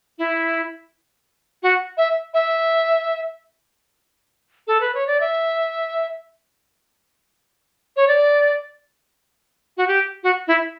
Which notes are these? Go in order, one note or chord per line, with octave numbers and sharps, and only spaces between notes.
E4
F#4
E5
E5
A4
B4
C#5
D5
E5
C#5
D5
F#4
G4
F#4
E4